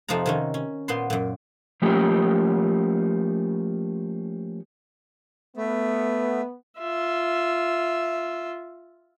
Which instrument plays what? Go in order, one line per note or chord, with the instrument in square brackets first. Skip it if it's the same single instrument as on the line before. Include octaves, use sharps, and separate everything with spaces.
[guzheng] F2 C3 F3 D#4 F#5 A#5
C3 D#3 C#4
C#4
A#2 B3 C5 C6
F#2 A#2
[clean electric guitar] F3 A3 A#3 C#4 F4 G4
[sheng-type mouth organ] A3 [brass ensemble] B3
[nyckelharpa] F4 E5